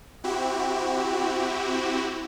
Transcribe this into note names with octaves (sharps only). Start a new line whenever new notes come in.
C4 E4 F#4 G4